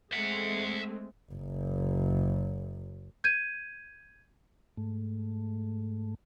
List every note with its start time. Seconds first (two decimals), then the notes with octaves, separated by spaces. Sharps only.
0.13 G#3 A3 C4 E5 F#5
1.32 F#1 F#2
3.24 G6 G#6 D#7
4.77 G#2 A3